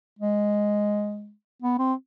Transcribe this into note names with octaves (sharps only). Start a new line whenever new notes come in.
G#3
B3
C4